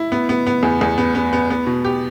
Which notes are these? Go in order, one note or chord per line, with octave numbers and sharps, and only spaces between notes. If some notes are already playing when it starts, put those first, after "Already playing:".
Already playing: E4
B3
B3
B3
E2
E2
B3
B3
B3
B3
B2
G4